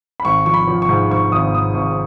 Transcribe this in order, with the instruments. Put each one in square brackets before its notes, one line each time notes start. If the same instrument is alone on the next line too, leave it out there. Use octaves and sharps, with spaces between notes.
[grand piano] B5
G#1 C#6
F3 C#6
B5
F3
C#6
G#2
G#2 C#6
G#1 D#6
G#1 D#6
G#1 C#6